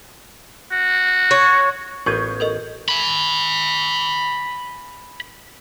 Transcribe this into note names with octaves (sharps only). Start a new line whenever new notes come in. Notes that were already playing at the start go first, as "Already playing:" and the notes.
F#4
C#5
A1 B3 F4 A#4 C#6 G6 G#6 D#7
A4 A#4 D#5
G#5 B5